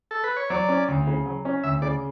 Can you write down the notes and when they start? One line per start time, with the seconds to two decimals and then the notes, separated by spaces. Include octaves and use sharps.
0.11 A4
0.24 B4
0.37 C#5
0.50 F#3 D5
0.69 C#4
0.88 D2
1.07 C#3
1.26 F#3
1.45 C#4
1.63 D2 E5
1.82 C#3 D5